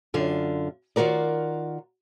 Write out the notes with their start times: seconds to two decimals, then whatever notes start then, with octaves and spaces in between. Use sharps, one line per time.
0.14 F#2 D3 F4
0.96 D#3 F4 F#4 A#4 D5